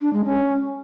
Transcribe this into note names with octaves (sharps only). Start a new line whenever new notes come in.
D4
G#3
C#4